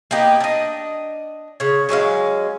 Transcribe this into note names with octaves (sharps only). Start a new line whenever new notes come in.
A#3 B3 D#4 G4
D4 D#5
C#3 C#5
F#3 G#3 C#4 F5